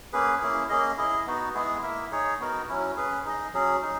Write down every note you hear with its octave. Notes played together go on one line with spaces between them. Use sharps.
A#3 C#4 G#4 B4
A#3 C#4 E4 G#4
A#3 C#4 G#4 D#5
E4 G#4 D#5
B3 D#4 F#4
G#3 B3 E4 G#4
A#3 E4 A#4 E5
D#4 G#4 C#5
B3 D#4 F#4 A#4
F#3 C#4 E4
C#4 G#4 B4
D#4 G#4 D#5
F#3 C#4 G#4
D#4 G#4